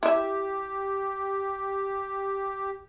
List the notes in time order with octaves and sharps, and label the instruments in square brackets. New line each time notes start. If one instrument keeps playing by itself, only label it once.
[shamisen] E4 E5 [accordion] G4